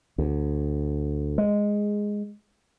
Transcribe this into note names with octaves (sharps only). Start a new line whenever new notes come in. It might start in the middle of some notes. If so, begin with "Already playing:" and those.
D2
G#3